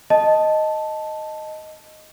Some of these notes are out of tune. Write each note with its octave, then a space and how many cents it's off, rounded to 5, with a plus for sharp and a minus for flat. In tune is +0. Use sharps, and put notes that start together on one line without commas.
D#5 +0 A5 +0